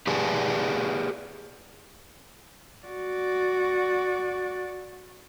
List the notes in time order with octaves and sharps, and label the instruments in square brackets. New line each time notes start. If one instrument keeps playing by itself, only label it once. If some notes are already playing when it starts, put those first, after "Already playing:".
[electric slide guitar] G4 G#4 B4 D5 G#5 A5
[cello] F#4 D5